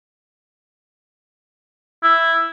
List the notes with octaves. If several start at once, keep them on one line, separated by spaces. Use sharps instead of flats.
E4